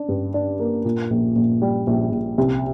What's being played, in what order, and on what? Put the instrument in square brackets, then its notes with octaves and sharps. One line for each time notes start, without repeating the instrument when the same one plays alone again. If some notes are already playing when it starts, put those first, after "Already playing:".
Already playing: [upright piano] D4
G2
D4
A#3
A#2
A#1
A#1
G3
A#1
A#1
C2